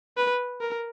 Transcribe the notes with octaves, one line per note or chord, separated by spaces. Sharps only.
B4
A#4